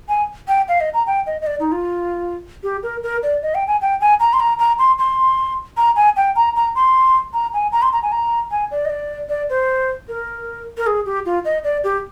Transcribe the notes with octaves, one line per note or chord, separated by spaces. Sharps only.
G#5
G5
F5
D#5
A#5
G5
D#5
D#5
D5
D#4
F4
G4
A#4
A#4
D5
D#5
G5
G#5
G5
G#5
A#5
C6
A#5
A#5
C6
C6
A#5
G#5
G5
A#5
A#5
C6
A#5
G#5
A#5
C6
A#5
G#5
A#5
G#5
D5
D#5
D5
D5
C5
A#4
A#4
G#4
G4
F4
D#5
D5
G4